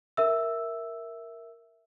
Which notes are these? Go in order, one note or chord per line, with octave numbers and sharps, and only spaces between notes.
A#4 E5 E6